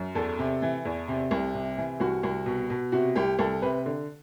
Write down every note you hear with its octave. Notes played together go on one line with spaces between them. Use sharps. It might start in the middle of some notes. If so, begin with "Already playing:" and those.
Already playing: F#2
E2 A4
C3
E3
E2
C3
C2
C3
E3
C2 F#4
C2
B2
B2
C3 F#4
C2 G4
C2 A4
C3 B4
D3